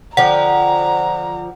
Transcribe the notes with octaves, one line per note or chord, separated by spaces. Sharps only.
D3 F3 F#5 G5 A#5